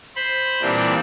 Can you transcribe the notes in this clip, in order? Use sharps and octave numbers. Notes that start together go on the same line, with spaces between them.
C5 B5
A#2 E3 G3 C4 D4